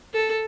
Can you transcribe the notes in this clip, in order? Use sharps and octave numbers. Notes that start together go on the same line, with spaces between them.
A4